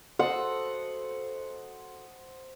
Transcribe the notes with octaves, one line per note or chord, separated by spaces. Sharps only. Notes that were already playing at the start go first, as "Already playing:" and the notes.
F#4 A4 C5 D#5 F#5